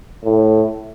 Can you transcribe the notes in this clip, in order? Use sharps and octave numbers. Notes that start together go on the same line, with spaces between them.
A2